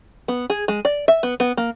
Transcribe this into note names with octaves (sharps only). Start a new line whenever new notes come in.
B3
G#4
G#3
D5
E5
B3
B3
A#3